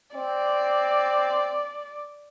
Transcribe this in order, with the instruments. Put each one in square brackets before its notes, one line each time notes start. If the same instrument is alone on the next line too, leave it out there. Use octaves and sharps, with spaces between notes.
[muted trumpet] C4 [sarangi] D5